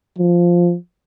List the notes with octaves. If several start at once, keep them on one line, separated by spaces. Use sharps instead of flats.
F3